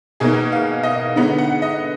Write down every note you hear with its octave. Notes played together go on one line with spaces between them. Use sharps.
B2 A#3 D#4 G#4
F5
D#5
D3 G#3 B3 D#4
F#5
D#5